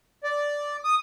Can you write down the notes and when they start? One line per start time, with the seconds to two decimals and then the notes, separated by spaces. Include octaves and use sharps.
0.24 D5
0.84 D#6